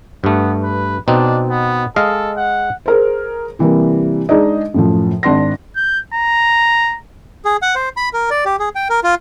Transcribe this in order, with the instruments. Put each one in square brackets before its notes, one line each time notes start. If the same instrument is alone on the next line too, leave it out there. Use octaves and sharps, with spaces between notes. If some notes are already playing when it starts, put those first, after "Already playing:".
[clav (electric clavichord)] G2 A3 [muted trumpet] B3
[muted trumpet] B4
[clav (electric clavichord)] B2 C4 D#4 [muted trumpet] D4
[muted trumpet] B3
[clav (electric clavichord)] G#3 D#5 F5 [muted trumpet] A4
[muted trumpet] F#5
[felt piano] G#4 A#4 C5
C3 E3 G3 A#3
G#3 D4 D#4 G#4 D5 D#5
F#2 A2 F3
G#1 D4 C6 A#6
[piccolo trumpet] G6
A#5
[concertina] G#4
F#5
C5
B5
A#4
D5
G4
G#4
G5
A#4
F4